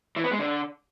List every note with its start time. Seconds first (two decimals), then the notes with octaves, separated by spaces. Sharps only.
0.16 E3
0.24 B3
0.32 G#3
0.39 D3